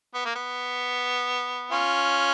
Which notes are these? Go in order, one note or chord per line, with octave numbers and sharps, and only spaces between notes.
B3
A#3
B3
C#4 F4